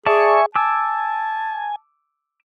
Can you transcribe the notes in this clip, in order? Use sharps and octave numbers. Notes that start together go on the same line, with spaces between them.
G#4 D5 E5 G#5 A5 C#6 D6
G#5 A5 D6 E6